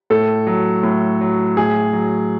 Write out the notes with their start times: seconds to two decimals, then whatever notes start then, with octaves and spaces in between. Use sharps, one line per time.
0.10 A2 A4
0.47 F#3
0.83 A2
1.21 F#3
1.57 A2 G#4
1.93 F#3